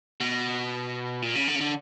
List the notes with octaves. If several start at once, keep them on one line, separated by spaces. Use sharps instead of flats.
B2
A#2
C#3
D3
C#3
D3